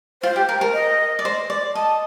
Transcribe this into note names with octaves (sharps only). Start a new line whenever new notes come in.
F4 C5
G4
A#4
A#4
D#5
D5
C5
D5
D#5 A5